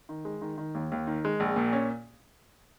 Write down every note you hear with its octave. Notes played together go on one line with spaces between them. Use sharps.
D#3
G#3
D#3
D#3
D#2
D#2
D#3
G#3
A#1
A#2
C#4